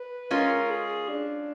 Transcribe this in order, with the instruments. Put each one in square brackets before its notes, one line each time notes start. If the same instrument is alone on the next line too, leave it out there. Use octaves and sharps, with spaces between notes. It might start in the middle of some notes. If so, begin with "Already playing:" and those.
Already playing: [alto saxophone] B4
[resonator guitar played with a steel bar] G#3 C#4 F4 [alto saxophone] A#4
[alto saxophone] G#4
D4